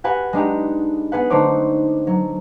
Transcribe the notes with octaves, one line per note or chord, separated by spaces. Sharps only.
F#4 G4 B4 F#5 G#5
G#3 D4 D#4 G4
B3 G#4 B4 F#5
D3 A3 D#4 C5 C#5 D6
F#3